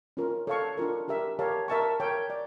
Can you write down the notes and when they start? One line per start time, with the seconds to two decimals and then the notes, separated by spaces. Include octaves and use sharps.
0.17 C#4 F4 A#4
0.47 A4 C#5 F5 A5 C#6
0.77 D4 F4 A#4
1.08 D4 G4 A#4 E5
1.39 G4 A#4 C#5 F5 A5
1.68 A#4 E5 A5 C#6
2.00 A#4 C#5 G5
2.30 D5